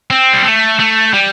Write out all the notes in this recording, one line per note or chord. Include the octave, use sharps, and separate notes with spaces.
C4
G3
A3
A3
G3